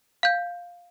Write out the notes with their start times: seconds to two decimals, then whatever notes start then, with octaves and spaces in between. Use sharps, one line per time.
0.23 F5 G6